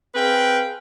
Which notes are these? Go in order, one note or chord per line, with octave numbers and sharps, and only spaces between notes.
C4 G#4 B4 F5 G5